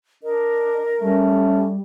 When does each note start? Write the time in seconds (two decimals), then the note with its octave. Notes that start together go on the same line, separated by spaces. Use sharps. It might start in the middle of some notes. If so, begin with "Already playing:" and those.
0.23 D4 A#4 D#5
1.01 G3 A3 C#4